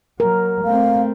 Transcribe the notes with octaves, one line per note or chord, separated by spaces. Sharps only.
F#3 A#4
A3 C4 F5